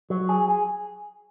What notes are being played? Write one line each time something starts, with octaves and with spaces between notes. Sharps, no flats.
F#3
G#4
G#4